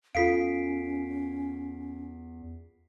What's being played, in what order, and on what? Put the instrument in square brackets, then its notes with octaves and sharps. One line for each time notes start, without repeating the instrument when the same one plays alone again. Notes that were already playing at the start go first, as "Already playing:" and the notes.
[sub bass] E2 [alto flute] C#4 [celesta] F4 A4 F5 [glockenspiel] B6 C7 D7